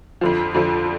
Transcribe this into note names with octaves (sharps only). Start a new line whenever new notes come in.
F2 D3 F3
F2 D3 F3